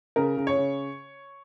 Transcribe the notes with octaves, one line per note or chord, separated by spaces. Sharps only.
C#3 A#4
C#3
C#5
C#3